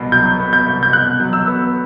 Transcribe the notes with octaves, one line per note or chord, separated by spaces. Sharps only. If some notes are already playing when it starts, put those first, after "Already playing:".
Already playing: C2 B2
F#3 G6
B3
G6
C2
G6
B2 F#6
F#3
E6
B3